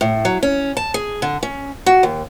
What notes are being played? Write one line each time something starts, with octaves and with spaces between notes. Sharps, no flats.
A2
F#3
C#4
A5
G#4
D3
C#4
F#4
D#2